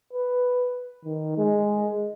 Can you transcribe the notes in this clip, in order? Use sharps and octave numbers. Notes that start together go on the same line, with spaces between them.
B4
D#3
G#3